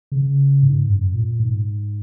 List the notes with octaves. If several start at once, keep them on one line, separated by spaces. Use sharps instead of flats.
C#3
G#2
F#2
A#2
G#2